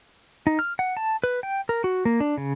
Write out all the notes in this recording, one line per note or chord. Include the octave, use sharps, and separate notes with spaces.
D#4
F6
F#5
A5
B4
G5
A#4
F#4
A#3
D4
C#3